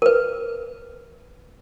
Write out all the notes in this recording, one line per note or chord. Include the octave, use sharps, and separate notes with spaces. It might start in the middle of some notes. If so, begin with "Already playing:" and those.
A#4 B4